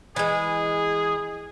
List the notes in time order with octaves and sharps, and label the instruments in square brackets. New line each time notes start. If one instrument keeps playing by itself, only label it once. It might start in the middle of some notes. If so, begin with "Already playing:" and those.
[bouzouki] E3 G#3 [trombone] G#4